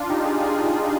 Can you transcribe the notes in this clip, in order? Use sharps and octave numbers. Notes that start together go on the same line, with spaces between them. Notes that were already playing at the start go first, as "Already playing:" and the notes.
Already playing: D4 F4
D#4 G4
F4 G#4
F4 G#4